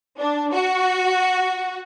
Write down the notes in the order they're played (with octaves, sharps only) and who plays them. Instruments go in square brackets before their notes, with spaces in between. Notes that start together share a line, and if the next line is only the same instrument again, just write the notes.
[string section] D4
F#4